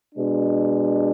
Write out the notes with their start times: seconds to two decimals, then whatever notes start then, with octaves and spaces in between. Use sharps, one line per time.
0.14 B2 G#3 D4